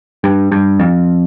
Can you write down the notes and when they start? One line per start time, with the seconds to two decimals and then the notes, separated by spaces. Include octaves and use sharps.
0.24 G2
0.52 G2
0.79 F2